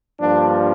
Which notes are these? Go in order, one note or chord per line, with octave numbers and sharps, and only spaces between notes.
G2 F3 A#3 D4